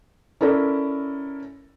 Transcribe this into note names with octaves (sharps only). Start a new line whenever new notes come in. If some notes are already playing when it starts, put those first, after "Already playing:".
C#4 E4 A4 A#4 D5